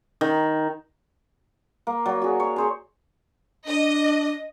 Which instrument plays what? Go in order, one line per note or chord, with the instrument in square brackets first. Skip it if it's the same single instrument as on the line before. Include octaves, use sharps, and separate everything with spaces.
[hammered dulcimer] D#3
A#3
F#3 D5
F#4 G#4
C#5
G#4 C5 C#5
[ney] D4 [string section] D#5